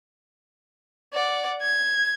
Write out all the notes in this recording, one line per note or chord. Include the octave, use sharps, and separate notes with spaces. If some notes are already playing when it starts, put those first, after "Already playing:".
D5 F#5
G#6